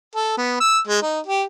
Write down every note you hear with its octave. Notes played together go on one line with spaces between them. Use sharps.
A4
B3
E6
G#3
D#4
G4